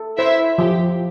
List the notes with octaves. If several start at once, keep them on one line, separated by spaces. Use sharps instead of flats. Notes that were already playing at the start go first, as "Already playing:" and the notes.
Already playing: A4
E4 C5 E5
F3 G4